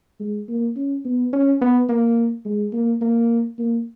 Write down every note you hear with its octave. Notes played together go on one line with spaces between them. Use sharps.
G#3
A#3
C#4
B3
C#4
B3
A#3
G#3
A#3
A#3
A#3